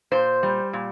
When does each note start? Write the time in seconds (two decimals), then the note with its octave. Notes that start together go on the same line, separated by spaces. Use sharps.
0.11 A#2 C5
0.43 G3
0.73 A#2